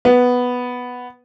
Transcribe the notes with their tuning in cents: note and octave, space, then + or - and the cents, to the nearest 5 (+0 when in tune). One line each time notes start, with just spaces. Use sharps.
B3 +0